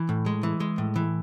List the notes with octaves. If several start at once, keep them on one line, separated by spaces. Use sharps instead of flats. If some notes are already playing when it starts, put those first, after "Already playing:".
Already playing: E3
A2
G#3
E3
G#3
A2
E3